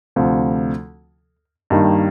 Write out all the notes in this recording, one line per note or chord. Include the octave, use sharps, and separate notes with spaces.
D2 C3 F3
G2 D#3 G3 A#3 D#4